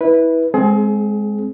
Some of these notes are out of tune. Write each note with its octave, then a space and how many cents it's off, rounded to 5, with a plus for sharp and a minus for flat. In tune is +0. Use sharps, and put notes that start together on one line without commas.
E4 -20 B4 -10
G#3 +0 C4 +0 G#4 +35